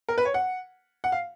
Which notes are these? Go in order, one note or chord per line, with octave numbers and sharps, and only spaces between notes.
A#4
B4
C#5
F#5
F#5
F5